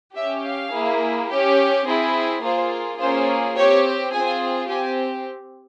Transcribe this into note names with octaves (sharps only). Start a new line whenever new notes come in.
C#4 G4 E5
F5
A#3 E4 G#4
C#4 G4
C4 E4 G#4
A#3 F4 G#4 C5
A#3 C#4 F4 G#4 C5
C4 G4 C#5
C4 F4 G#4 G#5
C4 G4 G#5